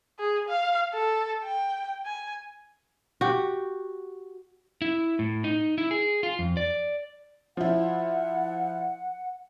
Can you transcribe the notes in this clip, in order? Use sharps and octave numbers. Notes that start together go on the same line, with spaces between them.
G#4
F5
A4
G5
G#5
F#4 G4
E4
A2
D#4
E4
G#4
F4
F2
D5
F3 E4 F#5